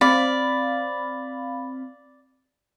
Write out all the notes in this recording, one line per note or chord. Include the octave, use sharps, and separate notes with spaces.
C4 D5 F5 B5